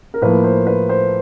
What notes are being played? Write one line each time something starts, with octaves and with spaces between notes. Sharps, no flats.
A#4
A2 F3 A#3 B4
C5
B4
C5